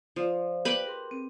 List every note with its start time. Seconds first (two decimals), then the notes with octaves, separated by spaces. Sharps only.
0.16 F3 C5 D5 F5
0.65 G4 B4 B5
0.85 G#4 A#4 C6
1.11 C4